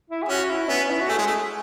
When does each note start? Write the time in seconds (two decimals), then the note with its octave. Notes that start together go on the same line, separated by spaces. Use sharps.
0.10 E4
0.23 G#4
0.29 C#4 F#4
0.50 E4
0.69 B3 C#4
0.90 E4
1.00 F#4
1.09 A3 G#4
1.18 G#3
1.27 A3